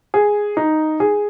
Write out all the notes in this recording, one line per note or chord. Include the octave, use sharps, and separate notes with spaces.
G#4
D#4
G#4